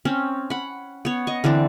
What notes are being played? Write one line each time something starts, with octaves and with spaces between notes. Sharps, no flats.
C4 C#4
F#5 B5
B3 C#5
D#5 C#6
D3 E3 C4 D4